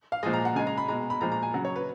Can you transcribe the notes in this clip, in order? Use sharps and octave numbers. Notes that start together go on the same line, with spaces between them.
F5
A#2 F3 G#3 D#5
A#5
F#5
C#3 G#3 G#5
A#5
B5
B2 G#3 A#5
B5
A#2 F3 G#3 A#5
A#5
G#5
C#3 F#3 F#5
C#5
B4